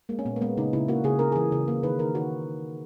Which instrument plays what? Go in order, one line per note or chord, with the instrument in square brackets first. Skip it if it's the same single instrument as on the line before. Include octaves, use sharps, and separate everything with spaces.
[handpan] G#3 A#3
C#4
A#2 B3
A#3
G#3 B3
C#3 D#4
C#3 E4
A#3 F#4
C#3 G#4
C#3 A#4
E3 G#4
C#3
A#3
D#3 B4
D#3 A#4
D#3 F#4